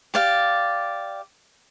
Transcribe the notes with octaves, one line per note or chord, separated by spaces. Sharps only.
G4 D5 F5